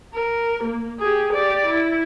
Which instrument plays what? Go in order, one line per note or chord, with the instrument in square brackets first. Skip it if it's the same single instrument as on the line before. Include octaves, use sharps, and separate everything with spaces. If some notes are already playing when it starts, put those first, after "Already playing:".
[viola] A#4
A#3
G4 G#4
G4 D5
E4